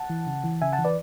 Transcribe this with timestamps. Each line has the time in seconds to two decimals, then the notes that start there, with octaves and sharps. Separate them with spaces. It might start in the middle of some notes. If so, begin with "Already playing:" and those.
Already playing: F#5 A5
0.10 E3
0.27 C#3
0.44 E3
0.62 C#3 E5 G#5
0.73 F#5 A5
0.79 E3
0.85 B4 D5